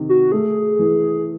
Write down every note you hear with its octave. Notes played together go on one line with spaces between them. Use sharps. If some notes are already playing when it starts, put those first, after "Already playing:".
Already playing: C3 D#3
F#4
A3 G#4
E3